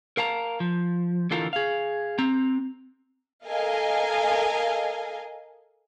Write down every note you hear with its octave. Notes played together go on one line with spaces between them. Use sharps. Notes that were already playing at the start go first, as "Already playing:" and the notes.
A#4 F5 A5 A#5
F3
D3 E3 F4 A4 A#4
G#4 F5
C4 A#5
A4 A#4 D#5 F5 G#5